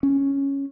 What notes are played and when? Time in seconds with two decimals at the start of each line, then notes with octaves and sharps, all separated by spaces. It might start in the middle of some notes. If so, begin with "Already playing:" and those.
0.03 C#4